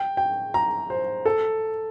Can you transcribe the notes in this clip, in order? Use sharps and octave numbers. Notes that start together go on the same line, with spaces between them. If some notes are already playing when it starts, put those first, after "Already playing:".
Already playing: G5
G5
A#5
C5
A4